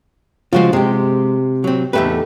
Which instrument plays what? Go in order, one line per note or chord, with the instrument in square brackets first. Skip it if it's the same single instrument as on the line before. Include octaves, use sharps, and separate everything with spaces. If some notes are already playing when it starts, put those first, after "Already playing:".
[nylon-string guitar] C#3 F3 G#3 [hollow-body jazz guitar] F4 F#4 C5
[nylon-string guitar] C3 G4 [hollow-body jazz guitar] G#3
[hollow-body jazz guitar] F#3 C4
[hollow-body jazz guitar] E2 A3 B4 [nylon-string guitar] D#4 G4 A4